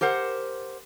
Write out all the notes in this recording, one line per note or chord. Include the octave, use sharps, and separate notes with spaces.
G4 A#4 C5 F#5